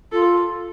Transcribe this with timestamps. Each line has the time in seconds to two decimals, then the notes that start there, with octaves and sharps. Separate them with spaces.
0.12 F4 A4